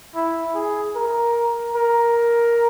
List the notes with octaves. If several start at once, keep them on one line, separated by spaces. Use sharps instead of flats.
E4
G#4
A#4
A#4